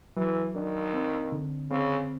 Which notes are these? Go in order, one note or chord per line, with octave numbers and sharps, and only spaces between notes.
E3 F#3
D#3 D4
C4
D3
C#3 C4